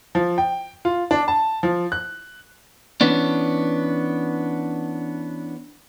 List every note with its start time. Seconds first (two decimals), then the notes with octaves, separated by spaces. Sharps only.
0.15 F3
0.38 G5
0.85 F4
1.11 D4
1.28 A5
1.63 F3
1.92 F#6
3.01 E3 B3 C#4 D4